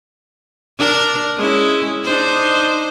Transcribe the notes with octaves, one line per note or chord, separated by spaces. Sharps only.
D4 A#4
G#3 C#4 E4
D4 D#4 C5